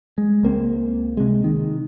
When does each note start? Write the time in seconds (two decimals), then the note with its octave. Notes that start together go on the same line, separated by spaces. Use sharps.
0.18 G#3
0.43 C#2 A#3 C4
1.17 C3 G#3
1.44 D#3